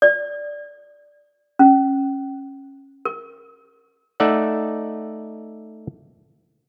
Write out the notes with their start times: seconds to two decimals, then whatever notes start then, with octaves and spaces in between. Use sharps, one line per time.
0.02 D5
1.59 C#4
3.05 A#4
4.20 A3 D#4 D5 E5 F#5